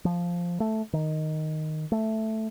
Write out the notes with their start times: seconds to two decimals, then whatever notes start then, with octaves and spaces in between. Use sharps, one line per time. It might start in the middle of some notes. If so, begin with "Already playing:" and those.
0.05 F3
0.60 A3
0.93 D#3
1.92 A3